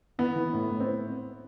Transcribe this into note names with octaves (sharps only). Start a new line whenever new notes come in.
E3 B3
E3
A2
A2
C4